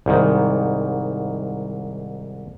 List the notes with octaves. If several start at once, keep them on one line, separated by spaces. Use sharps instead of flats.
C2 G#2 D#3